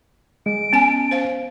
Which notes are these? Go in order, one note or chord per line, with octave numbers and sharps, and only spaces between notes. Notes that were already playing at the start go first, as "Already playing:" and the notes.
G#3 D7
B3 C#4 G#5 A5
C5 F5